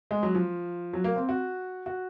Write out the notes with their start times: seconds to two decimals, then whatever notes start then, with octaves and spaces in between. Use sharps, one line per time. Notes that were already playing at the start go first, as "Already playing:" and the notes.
0.11 G#3
0.23 F#3
0.35 F3
0.93 F#3
1.04 A#3
1.16 C4
1.29 F#4
1.86 F#4